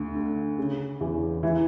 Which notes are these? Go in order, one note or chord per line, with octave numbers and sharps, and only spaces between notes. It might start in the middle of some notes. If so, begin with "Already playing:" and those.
Already playing: D2
D3
C#3
E2
E3